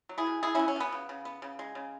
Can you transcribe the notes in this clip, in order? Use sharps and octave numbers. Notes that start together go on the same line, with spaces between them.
F#3
E4 G#4
B2
B2 E4 G#4
B2 C#4 E4
C#4
B2 B3
C#3
C#3
B3
C#3
G#3
C#3